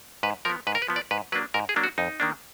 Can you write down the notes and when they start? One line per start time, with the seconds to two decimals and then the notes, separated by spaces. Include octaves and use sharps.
0.23 G#2 B4
0.45 F3 B3 A#4
0.67 G#2 B4
0.75 A#4
0.82 B4
0.88 F3 B3
0.96 D5
1.11 G#2 B4
1.32 F#3 A#3 D4 B4
1.54 G#2 A#4
1.69 G#4
1.76 F#3 A#3 D4
1.84 F#4
1.98 F2 D#4
2.20 D#3 A#3 D4